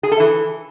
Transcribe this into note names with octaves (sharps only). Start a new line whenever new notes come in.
G#4
A4
E3